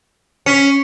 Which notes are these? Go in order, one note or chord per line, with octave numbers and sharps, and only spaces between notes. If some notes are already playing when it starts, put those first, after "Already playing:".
C#4 C#6 B6 C#7